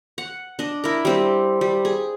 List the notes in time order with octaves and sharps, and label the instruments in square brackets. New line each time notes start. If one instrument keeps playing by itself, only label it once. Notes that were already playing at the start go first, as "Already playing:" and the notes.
[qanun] F#5
D4 D#5
E4 A#4
G3 C4 G4
G3
G#4